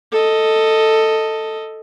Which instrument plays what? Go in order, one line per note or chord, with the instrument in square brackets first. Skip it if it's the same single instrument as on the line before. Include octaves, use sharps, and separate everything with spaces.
[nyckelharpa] A4 D#5